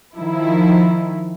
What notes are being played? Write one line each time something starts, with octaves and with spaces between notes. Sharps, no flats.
D#3 F3 E4